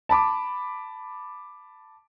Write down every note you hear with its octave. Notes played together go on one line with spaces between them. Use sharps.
A5 B5 D6